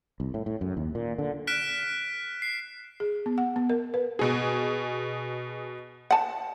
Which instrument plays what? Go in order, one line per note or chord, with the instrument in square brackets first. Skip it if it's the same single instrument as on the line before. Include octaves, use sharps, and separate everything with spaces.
[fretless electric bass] C2
A2
A2
F#2
D#2
A#2
D3
[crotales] F6 F#6 B6 D7 E7
C7
[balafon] G#4
B3
F#5
B3
A#4
B4
[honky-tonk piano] B2 G#4
[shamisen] F#5 A5